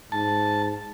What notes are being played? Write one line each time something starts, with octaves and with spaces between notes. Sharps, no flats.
G#2 A5